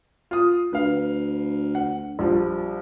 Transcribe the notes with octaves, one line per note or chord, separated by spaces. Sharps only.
F4 D#6
D2 B4 F5
F#5
A#1 F3 G3